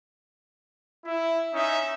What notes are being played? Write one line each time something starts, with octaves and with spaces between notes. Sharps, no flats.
E4
C#4 D#4 E5